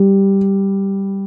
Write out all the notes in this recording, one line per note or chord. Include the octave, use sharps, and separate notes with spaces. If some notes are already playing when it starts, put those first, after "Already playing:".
Already playing: G3